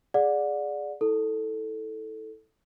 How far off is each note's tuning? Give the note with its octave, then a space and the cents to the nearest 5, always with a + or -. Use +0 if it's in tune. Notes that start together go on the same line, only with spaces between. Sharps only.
G#4 +0 D5 +0 F#5 -35
E4 -25 A4 +0